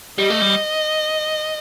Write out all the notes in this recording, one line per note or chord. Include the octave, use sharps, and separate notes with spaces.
G3 D#5
A3
G3